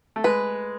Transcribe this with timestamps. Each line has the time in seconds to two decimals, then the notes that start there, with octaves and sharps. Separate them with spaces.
0.16 A3
0.24 G#3 B4